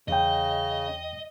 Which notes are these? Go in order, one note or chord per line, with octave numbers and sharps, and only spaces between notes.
E2 C#3 D#5 G5